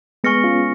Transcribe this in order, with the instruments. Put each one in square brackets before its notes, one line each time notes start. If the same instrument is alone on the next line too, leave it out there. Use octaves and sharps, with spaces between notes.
[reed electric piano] G#3 B3 [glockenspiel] G#5 C#6 F6 A#6 C#7
[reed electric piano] C#4 F4